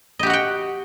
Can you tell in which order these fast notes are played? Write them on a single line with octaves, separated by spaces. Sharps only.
D#5 G4 F#4 F#5 G5